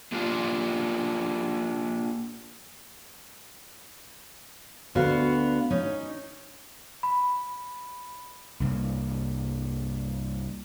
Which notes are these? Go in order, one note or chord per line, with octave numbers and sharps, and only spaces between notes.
A#3 D4 F4 G4
D2 D3 B3 F#4 F5
C#4 D#4
B5
C2 G2 A#3